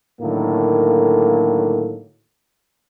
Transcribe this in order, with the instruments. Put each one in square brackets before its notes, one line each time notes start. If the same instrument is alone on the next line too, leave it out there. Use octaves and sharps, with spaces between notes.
[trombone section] A2 D3 D#3 F#3 A#3